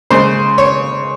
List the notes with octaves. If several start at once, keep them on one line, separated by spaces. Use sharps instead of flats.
C#3 G#3 C5
C#5